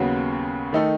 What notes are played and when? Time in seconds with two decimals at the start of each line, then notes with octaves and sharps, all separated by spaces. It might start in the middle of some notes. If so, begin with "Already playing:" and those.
Already playing: D#2 C#3 F#3 B3 F#4
0.73 D#3 A3 D#4 A4